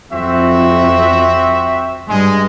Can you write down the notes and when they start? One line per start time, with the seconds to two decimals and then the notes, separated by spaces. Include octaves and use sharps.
0.12 F2 C4 F#4 E5
2.09 G2 G#3